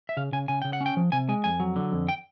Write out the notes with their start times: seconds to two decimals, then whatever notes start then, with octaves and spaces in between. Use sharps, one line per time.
0.09 E5
0.17 C#3 F5
0.32 C#3 G#5
0.48 C#3 G#5
0.62 C#3 G5
0.73 F#5
0.81 C#4
0.86 G5
0.97 F3
1.12 C3 G#5
1.29 G#3 G#5
1.44 F2 G#5
1.60 F#3
1.76 D3
1.92 F2
2.09 G5